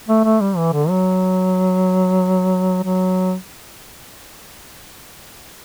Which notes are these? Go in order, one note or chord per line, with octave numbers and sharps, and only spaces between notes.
A3
A3
G3
E3
D3
F#3
F#3